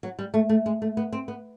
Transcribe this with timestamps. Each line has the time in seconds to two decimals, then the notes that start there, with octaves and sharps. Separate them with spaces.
0.03 F#3
0.19 G3
0.34 A3
0.49 A3
0.66 G#3
0.82 A3
0.97 B3
1.12 C4
1.28 B3